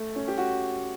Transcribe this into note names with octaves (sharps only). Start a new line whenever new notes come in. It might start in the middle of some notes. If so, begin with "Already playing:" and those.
Already playing: A3
C#4
G4
F#4